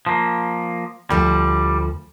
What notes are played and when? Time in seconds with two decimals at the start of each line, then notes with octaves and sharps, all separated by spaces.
0.07 F3 A#3
1.10 D2 F3 G3